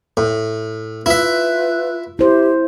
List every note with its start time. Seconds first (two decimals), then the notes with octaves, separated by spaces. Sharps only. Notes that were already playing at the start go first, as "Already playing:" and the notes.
0.17 A2
1.06 E4 F4 B4 E5
2.19 E4 G4 C5